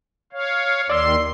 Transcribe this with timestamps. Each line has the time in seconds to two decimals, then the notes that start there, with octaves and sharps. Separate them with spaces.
0.33 C#5 F5
0.90 D#2 D#3 D5 C6 E6